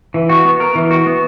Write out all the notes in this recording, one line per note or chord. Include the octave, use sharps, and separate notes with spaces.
E3
F#4
B3
A#4
E3
F#4
B3